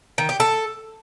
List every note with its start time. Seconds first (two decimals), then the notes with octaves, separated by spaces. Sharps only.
0.18 D#3
0.29 G4
0.40 A4